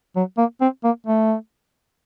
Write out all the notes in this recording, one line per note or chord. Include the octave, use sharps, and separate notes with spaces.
F#3
A#3
C4
A#3
A3